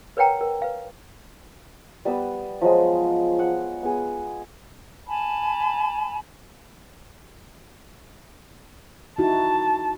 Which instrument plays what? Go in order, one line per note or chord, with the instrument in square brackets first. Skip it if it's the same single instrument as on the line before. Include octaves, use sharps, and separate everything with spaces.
[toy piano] A#4 B4 C#5 F#5 G5 A#5
A#4
B4 F5
[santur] G3 B3 D#6 E6
F3 F#3 G#3
F#5
B3 G#4
[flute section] G#5 A5 B5
[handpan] D#4 E4 F#4 [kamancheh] A5